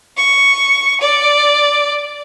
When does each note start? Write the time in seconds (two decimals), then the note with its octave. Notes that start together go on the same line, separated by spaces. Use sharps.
0.17 C#6
1.01 D5